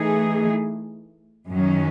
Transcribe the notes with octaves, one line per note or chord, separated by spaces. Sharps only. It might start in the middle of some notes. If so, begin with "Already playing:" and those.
Already playing: E3 A3 D#4 G#4
F#2 D#3 F#3 C#4